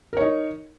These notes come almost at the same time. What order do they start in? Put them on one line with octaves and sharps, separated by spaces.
A#4 C#5 D#4